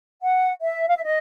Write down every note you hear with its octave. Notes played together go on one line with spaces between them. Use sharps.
F#5
E5
F5
E5
D#5